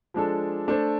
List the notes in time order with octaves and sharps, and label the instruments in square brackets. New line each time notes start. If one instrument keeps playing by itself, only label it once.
[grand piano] F3 G#3 D4 A4
A3 D4 A4 C5